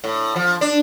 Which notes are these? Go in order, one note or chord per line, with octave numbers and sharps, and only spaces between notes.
A2
F3
D4